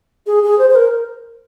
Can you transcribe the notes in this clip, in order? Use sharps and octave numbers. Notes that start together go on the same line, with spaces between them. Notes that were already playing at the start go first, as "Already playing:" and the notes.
G#4
G#4
C5
C5
A#4